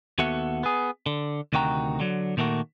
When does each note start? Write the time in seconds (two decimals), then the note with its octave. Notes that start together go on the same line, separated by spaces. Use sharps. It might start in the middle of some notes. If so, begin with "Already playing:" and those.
0.18 D#2 B3 F#4 A4 E5 F#5
0.63 B3 G#4
1.06 D3
1.53 D2 C3 D#3 F#4 G5 A#5
2.00 D3 F#3
2.37 A#2 D#3 A3 A#3 F#4